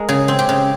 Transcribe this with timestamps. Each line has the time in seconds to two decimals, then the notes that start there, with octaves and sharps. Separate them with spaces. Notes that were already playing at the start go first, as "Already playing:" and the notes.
Already playing: G#3 A#4
0.09 C#3 G#4
0.28 C4
0.39 G4
0.49 C#3